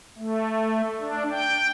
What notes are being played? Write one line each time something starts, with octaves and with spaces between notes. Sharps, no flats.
A3
D4
G5